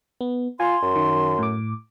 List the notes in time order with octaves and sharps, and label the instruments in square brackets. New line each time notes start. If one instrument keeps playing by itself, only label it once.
[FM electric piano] B3
[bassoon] F4 [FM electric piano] G#5 [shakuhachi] C6
[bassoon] F#2
[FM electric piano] D#3
A2 D6